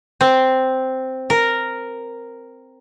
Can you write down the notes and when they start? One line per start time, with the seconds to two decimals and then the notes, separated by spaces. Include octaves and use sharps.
0.21 C4
1.30 A#4